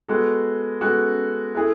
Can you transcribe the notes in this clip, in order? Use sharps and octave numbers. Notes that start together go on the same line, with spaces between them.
G#3 B3 F#4 A4
G#3 B3 F#4 A4
A3 E4 G#4